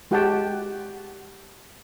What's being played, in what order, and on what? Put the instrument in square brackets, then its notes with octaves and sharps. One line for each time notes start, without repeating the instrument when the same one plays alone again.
[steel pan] G#3 F#4 G4 F#5 G5 A5